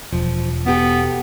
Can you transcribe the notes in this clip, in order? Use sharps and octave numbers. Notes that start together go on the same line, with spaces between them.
E1 F3
B2 B3 G4 A4